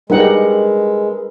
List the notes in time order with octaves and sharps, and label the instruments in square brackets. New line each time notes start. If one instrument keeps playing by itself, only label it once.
[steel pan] G3 D#4 F#5 [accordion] G#3 [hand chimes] A#4 B4